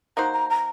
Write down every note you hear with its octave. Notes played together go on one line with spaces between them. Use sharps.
A#3 D#4 F#4 C5 A#5
A#5
A#5